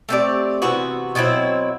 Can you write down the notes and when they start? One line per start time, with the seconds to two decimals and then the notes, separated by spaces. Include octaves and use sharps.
0.09 A3 C4 G4 D5
0.62 C3 E3 B3 F#4
1.15 B2 F#3 C4 E4